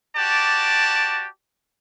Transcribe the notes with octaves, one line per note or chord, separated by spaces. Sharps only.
F#4 G4 D5 A5